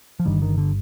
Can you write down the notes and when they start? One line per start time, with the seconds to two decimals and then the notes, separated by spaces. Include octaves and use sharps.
0.20 F3
0.25 G1 G2 D3 D#3 G3
0.42 D#3
0.58 D3